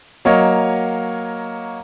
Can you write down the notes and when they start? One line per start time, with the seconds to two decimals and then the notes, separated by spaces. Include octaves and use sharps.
0.25 F#3 A#3 C#5 D#5